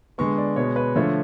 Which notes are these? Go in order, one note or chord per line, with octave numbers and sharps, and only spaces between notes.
D3 G#3 B3 C#6
D5
B2 G#3 B3 C#5
B4
D3 F3 A3 C#5